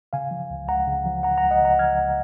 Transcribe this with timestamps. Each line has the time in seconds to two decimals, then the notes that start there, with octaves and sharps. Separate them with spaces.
0.13 C#3 F5 G#5
0.31 F3
0.50 C#2
0.68 C#2 F#5 A#5
0.87 C#3
1.05 F3
1.23 C#2 F#5 A#5
1.38 C#2 F#5 A#5
1.51 D#5 F#5
1.61 C#3 F#5 A#5
1.79 F3 F6 G#6
1.98 C#2